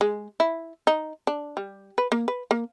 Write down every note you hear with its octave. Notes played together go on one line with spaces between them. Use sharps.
G#3
E4
D#4
D4
G3
B4
A#3
B4
A#3